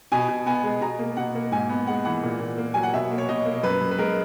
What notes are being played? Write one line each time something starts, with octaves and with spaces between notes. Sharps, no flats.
B2 G#5
B2
B3 G#5
G#3
B2 A#5
A#3
B2 F#5
A#3
G#2 G#5
B3
G#3 F#5
E3 F#5
A#2
A#2
A#3
F#3 G#5
F#5
B2 E5
A#3
C#5
B2 D#5
A#3
F#2 B4
F#2
B4
G#3 A#4